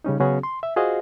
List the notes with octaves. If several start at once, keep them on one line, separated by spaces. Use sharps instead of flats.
C#3 G3 C#4 D#4
C#3 F#3 B3 C#4 F#4 G#4
C6
E5
F4 F#4 G#4 C5 D#5 F5